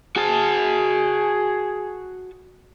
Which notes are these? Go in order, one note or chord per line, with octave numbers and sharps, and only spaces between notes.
F#4 G#4 A5